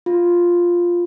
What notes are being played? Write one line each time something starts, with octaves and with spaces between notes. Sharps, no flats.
F4